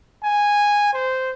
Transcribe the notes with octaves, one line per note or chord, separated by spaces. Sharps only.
G#5
C5